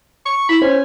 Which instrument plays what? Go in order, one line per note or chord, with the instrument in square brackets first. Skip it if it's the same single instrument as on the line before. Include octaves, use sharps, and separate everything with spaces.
[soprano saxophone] C#6
[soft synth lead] E4 [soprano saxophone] B5
[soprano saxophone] C#4 [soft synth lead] C5